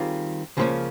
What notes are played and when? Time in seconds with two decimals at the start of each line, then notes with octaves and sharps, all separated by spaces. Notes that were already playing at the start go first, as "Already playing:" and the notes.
Already playing: D#3 G3 C4 F4 G#4
0.57 C#2 C#3 F3 A#3 C#4